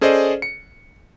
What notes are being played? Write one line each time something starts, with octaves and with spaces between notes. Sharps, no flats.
C#4 G#4 A4 C5 D5 D#5
C#7